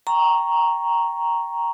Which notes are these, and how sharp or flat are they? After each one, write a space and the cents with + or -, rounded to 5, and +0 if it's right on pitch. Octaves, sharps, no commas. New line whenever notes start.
G5 -5 A#5 +0 C#6 +0